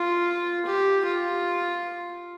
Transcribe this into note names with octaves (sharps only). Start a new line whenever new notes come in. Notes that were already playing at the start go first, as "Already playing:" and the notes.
Already playing: F4
G4
F4